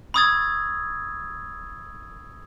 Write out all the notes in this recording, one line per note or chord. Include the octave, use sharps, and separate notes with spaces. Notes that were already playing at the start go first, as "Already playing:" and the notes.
B5 C#6 D#6 E6 G#6 A6